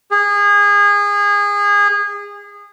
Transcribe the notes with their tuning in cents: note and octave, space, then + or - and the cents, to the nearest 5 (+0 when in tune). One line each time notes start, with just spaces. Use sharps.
G#4 -25